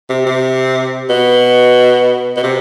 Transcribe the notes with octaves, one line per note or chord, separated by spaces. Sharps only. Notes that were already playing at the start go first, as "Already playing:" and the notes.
C3
C3
B2
B2
C3